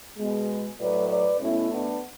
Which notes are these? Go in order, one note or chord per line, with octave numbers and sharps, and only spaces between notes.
B2 G#3
A2 F#3 A3 B4 D5
B4 D5
B2 A3 C#4 E4
B3 D4